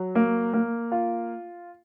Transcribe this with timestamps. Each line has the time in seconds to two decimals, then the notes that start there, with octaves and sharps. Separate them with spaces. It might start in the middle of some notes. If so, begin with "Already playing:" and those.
Already playing: F#3
0.15 A#3
0.54 A#3
0.92 F4